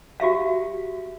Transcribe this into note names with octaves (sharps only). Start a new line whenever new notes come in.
F#4 G4 E5 F5